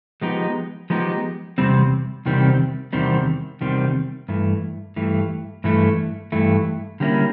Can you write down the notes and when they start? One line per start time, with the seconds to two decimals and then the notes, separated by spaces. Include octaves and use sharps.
0.22 F3 G#3 B3 D#4 G4
0.90 F3 G#3 B3 D#4 G4
1.58 E2 C3 D#3 G3 C4
2.26 E2 C3 D#3 G3 C4
2.93 E2 C3 D#3 G3 C4
3.61 E2 C3 D#3 G3 C4
4.29 G2 E3 A3
4.96 G2 E3 A3
5.64 G2 E3 A3
6.32 G2 E3 A3
7.00 D3 G3 A#3 C#4 E4